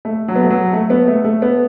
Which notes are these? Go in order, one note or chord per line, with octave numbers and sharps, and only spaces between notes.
A3
F#3
B3
A3
F#3
A3
B3
A3
A3
B3